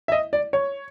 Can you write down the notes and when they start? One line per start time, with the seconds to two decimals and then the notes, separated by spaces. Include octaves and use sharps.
0.08 E5
0.12 D#5
0.33 D5
0.53 C#5